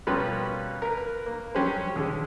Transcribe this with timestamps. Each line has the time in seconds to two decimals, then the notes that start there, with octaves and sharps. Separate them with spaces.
0.07 B2 G3 A#3 C#4 F4 B4
0.82 A#4 B4
1.26 A#3
1.55 F#3 G3 C#4 G4 C5
1.96 D#2 D3 G#3